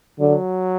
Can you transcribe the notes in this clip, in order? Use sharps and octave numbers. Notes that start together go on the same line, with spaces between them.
D3 F#3